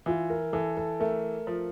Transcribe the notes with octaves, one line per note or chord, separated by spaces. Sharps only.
E3 F4
A#4
E3 A4
A4
A3 A#4
F3